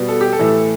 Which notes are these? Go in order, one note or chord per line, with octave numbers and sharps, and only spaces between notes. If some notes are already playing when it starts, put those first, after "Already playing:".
Already playing: B2 G3 B3
A4
G4
A4
A2 E3 A3